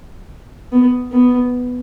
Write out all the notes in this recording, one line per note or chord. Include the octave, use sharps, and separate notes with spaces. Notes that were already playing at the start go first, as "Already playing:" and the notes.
B3
B3